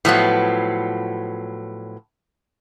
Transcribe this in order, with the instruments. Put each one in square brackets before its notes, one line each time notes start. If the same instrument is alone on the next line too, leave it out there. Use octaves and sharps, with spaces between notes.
[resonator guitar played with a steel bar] A2 F3 F#3 B3